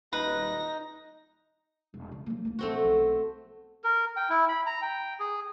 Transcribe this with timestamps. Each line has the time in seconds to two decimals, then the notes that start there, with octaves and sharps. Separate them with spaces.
0.13 D#1 D#4 B4 A#6
1.94 E1
2.12 C#3
2.26 F#3 A#3
2.45 D1 A#3
2.59 A#1 F3 A3 C4 F#4
2.84 B1
3.84 A#4
4.16 G5
4.29 E4
4.49 B5
4.66 A#5
4.82 G5
5.20 G#4